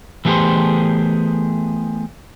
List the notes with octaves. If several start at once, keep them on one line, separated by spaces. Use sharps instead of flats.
E3 A3 B3 G4 G#4 C5